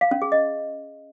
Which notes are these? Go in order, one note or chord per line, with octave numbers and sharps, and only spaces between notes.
F5
C#4
G#4
D#5